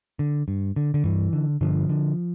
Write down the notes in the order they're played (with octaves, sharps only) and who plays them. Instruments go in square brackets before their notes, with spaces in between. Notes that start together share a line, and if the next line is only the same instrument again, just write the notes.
[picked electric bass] D3
G2
D3
D3
G2 E3
D3
G2 D3 F3
D3